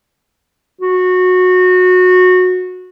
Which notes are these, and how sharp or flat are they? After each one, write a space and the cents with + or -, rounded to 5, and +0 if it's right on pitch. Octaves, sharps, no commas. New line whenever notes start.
F#4 -20